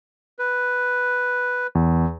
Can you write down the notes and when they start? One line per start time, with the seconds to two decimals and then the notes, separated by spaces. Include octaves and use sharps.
0.39 B4
1.75 E2